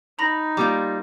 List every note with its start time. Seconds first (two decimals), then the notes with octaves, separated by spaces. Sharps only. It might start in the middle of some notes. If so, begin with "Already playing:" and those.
0.19 D#4 A#5 B5 A#6
0.57 G3 A#3 F4 D6